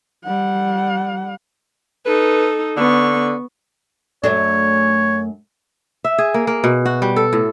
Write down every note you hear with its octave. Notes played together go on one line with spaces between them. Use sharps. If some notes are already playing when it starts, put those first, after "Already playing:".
G3 F#5
D#4 A4 B4
D3 B3 C#6
F#2 A3 D4 C#5
E5
G#4
A#3
A#3
B2
F#4
G3
A4
A2